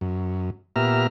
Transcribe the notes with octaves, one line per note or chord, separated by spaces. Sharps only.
F#2
A#2 B3 G4 E5 A#5 F6